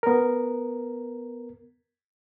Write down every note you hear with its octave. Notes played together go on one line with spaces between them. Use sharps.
B3 A#4